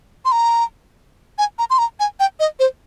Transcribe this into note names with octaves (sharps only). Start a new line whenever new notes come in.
C6
A#5
G#5
A#5
C6
A#5
G#5
G5
D#5
C5